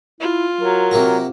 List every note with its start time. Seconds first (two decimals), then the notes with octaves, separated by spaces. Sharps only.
0.21 E4 F4
0.61 F#3 A#4
0.91 C3 A#3 F#4